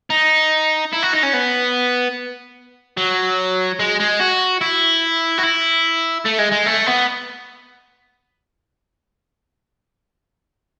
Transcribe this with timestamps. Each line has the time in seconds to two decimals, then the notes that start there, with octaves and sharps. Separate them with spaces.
0.10 D#4
0.93 E4
1.03 F#4
1.13 D#4
1.23 C#4
1.33 B3
2.97 F#3
3.80 G#3
4.00 G#3
4.20 F#4
4.61 E4
5.38 F#4
5.43 E4
6.26 A3
6.39 G#3
6.52 G#3
6.66 A3
6.87 B3